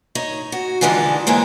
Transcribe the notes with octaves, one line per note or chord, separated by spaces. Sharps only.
D#4 C#5
F#4
D3 E3 F3 G#3 D4 D#4
E3 G3 G#3 A#3 C5